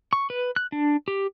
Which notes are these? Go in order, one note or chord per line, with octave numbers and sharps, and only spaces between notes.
C#6
B4
F#6
D4
G4